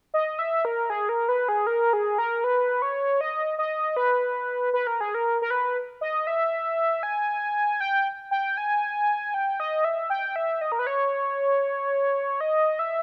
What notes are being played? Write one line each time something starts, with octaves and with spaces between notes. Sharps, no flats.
D#5
E5
A#4
G#4
A#4
B4
G#4
A#4
G#4
A#4
B4
C#5
D#5
D#5
B4
B4
A#4
G#4
A#4
A#4
B4
D#5
E5
G#5
G5
G5
G#5
G5
D#5
E5
G5
E5
D#5
A#4
B4
C#5
D#5
E5